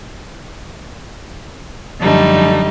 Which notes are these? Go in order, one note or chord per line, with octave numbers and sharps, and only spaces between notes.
F#2 D3 F3 G3 A3 D#4